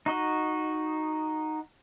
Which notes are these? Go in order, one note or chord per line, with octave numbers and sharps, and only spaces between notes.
D#4 F#4 D#5